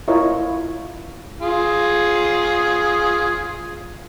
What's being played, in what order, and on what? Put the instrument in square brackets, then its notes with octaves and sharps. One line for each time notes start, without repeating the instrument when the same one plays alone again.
[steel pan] E4 F4 A#4 C#5 D#5
[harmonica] F4 G#4